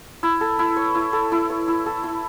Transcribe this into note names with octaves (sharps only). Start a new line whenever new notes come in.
E4
A4
E4
C#5
E4
A4
E4
C#5
E4
A4
E4